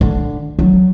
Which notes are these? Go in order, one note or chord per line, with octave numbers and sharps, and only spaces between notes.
D3
F#3